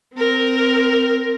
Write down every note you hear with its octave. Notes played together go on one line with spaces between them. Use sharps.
C4 A#4